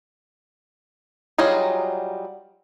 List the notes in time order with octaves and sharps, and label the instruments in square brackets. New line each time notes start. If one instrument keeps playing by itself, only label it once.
[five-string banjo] F#3 G3 D#4 F4 G#4